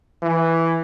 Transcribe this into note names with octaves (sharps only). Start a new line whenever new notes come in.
E3